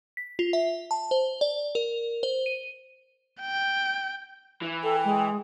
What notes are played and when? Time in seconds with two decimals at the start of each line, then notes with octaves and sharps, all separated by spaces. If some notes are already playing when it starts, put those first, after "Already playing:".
0.17 B6
0.39 F4
0.53 E5
0.91 A5
1.11 C5
1.41 D5
1.75 A#4
2.23 C5
2.46 D#7
3.41 G5
4.62 E3
4.83 A4 G5
5.05 G#3